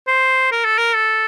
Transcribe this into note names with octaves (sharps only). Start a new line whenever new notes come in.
C5
A#4
A4
A#4
A4